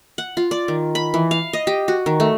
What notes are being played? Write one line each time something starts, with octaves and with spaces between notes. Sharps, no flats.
F#5
F4
D5
D#3
B5
E3
F5
D#5
G4
F#4
D#3
A3